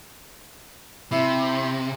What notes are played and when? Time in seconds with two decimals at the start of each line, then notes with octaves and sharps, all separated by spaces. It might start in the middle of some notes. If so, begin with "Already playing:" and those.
1.11 C3 E4